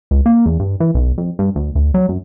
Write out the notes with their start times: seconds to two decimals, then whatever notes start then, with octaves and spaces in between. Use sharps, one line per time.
0.11 C#2
0.26 A#3
0.46 E2
0.60 G2
0.80 E3
0.95 B1
1.18 F2
1.39 G2
1.56 D2
1.75 D2
1.94 F#3
2.09 F#2